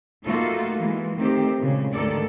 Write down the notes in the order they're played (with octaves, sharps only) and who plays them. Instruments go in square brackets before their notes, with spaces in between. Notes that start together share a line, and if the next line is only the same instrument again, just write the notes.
[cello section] A3 A#3 D#4 F4 F#4 A4
E3 G#3
D#3 A3 C4 G4
A#2 C#3 G#3
D2 G#2 D#3 A4 D5